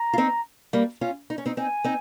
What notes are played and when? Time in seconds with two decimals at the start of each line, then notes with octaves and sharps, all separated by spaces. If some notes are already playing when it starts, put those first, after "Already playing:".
Already playing: A#5
0.13 F4
0.18 C4 D#4
0.73 G3 A#3
1.01 C#4 F4
1.30 D#4
1.38 C#4
1.46 C4 D#4
1.57 C4 D#4 G#5
1.84 C4 D#4